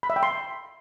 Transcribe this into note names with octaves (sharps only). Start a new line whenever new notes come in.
B5
E5
G5
C6